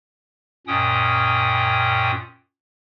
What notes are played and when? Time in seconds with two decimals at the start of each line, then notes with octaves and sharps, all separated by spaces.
0.67 F#2 A#2 C#4 G5 D#6